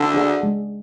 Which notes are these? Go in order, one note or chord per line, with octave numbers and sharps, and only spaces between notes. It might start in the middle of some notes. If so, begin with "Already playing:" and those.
Already playing: D3
D4 G#4 D5 F#5
G#3